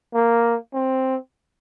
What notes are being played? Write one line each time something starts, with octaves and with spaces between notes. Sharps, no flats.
A#3
C4